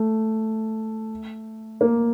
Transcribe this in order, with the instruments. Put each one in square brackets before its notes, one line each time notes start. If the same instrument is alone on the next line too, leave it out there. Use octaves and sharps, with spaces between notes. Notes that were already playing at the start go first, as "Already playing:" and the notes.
Already playing: [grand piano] A3
A#3